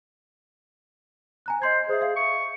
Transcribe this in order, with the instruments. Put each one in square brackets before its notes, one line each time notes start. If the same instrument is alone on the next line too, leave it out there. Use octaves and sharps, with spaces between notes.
[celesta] G#5 A#5 F#6
[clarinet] C5 [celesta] D#5 C6 G#6
[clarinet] G#4 [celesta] C5 E5
[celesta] E5 F5
[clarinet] C#6